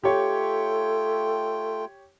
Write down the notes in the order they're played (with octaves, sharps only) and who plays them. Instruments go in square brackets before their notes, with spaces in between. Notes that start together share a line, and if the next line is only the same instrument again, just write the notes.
[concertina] A3 F4 G5 [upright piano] G4 C#5 [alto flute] A4